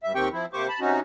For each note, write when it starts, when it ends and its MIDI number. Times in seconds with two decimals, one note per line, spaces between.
0.03 0.13 43
0.03 0.13 76
0.15 0.29 39
0.15 0.29 51
0.15 0.29 60
0.15 0.29 67
0.15 0.29 79
0.15 0.29 85
0.32 0.46 53
0.32 0.46 60
0.32 0.46 64
0.53 0.67 48
0.53 0.67 58
0.53 0.67 67
0.53 0.67 72
0.53 0.67 85
0.53 0.67 86
0.68 0.80 81
0.68 0.80 83
0.80 1.00 48
0.80 1.00 61
0.80 1.00 63
0.80 1.00 66